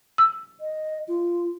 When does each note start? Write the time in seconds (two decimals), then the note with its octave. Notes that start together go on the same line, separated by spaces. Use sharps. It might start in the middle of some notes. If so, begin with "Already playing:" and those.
0.18 E6
0.60 D#5
1.08 F4